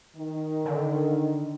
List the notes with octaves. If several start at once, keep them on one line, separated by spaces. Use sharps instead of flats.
D#3
D3